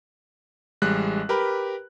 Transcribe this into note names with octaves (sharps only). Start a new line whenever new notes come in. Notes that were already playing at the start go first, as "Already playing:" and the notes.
A1 G3 G#3 F#6
G4 A#4 B4 B5